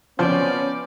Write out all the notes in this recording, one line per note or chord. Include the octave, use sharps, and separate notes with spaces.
F3 B3 C#4 C5 D5